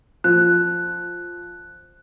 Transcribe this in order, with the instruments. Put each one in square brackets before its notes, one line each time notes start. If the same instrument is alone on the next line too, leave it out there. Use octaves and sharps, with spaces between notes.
[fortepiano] F3 [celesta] F#6